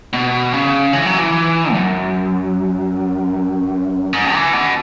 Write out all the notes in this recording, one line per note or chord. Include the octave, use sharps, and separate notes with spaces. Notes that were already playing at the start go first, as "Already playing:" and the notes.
B2
C#3
E3
F#3
E3
F#2
G#2
E3
B2